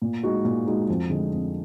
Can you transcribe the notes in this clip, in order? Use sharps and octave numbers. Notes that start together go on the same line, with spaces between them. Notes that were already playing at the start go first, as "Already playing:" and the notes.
A#2
G#3 D#4 F#4
A#2
G#3 D#4 F#4
F2
D3 G#3
F2